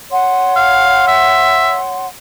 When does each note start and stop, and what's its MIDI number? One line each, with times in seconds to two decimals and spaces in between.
0.11 2.05 73
0.11 2.05 78
0.11 2.05 84
0.56 1.03 77
1.07 1.77 76